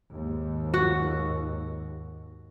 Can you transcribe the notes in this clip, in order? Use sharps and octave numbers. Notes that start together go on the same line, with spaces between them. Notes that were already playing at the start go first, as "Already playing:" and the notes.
D#2 G#2
F#4